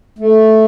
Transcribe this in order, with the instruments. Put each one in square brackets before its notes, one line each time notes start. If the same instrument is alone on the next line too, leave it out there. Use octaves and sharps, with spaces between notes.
[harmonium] A3